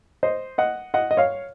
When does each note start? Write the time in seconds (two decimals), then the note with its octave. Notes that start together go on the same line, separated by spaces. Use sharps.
0.23 C5 D#5
0.58 D#5 F#5
0.94 D#5 F#5
1.11 D#5
1.17 C#5 F5